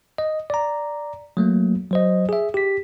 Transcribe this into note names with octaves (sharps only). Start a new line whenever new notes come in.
D#5
D5 A#5
F#3 A3 A#3
F#3 C5 D#5
G#4 E5
G4 B6